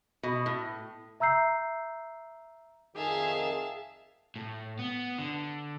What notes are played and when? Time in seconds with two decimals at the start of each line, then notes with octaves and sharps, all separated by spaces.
0.23 B2
0.46 A2
1.20 E5 A#5 E6 G6 C7
2.96 F2 D#3 G#4 E5 F5 A5
4.36 A2
4.79 B3
5.18 D3